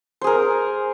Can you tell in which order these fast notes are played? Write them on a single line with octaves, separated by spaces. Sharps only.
C5 G#4 A#4